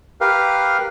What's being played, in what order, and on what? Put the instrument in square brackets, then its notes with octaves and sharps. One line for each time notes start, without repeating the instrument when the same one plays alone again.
[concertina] G4 A#4 B4 F5